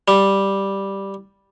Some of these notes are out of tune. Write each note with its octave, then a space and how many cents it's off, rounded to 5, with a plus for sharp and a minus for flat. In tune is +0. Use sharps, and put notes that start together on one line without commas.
G3 +0